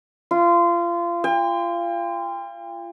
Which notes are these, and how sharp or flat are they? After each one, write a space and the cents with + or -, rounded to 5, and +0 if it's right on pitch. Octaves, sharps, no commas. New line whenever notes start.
F4 -25
G5 +35